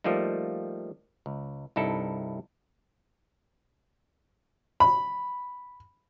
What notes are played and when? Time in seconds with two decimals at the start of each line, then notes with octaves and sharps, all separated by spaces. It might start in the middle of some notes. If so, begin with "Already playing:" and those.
0.04 F3 G3 A3 A#3 D#4
1.26 C#2
1.76 C2 G2 D#4 E4 A4
4.80 B5